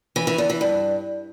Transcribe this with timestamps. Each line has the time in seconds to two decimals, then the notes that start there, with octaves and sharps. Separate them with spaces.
0.16 E3
0.27 E3
0.38 E2
0.50 E3
0.61 G2